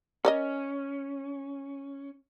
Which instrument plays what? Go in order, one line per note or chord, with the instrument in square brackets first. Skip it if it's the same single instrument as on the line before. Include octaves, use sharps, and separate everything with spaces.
[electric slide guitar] C#4 [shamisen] A#4 D5 D#5